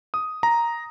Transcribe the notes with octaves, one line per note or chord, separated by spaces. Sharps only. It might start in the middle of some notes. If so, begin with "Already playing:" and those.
D#6
A#5